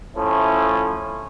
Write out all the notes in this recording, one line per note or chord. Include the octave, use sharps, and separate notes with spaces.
F3 A3 C#4 E4